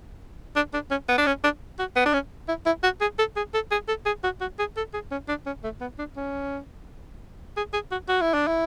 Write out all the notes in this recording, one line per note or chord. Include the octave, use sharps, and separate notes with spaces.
D4
D4
C#4
B3
D4
C#4
D4
F#4
B3
D4
C#4
E4
E4
F#4
G#4
A4
G#4
A4
G#4
A4
G#4
F#4
F#4
G#4
A4
G#4
C#4
D4
C#4
A3
B3
D4
C#4
G#4
G#4
F#4
F#4
E4
D4
E4